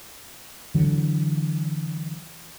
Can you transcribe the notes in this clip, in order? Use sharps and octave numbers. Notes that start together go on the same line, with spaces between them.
D3 E3 F#3